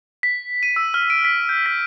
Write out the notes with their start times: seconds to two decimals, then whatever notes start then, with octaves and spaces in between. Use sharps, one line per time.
0.23 B6
0.63 D#7
0.76 E6
0.94 F6
1.10 D7
1.25 B6
1.49 G6
1.66 B6